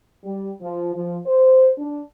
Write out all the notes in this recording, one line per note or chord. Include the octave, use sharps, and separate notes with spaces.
G3
F3
F3
C5
D4